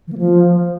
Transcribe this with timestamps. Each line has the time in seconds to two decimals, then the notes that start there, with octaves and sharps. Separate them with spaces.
0.07 E3
0.13 A#3
0.18 F3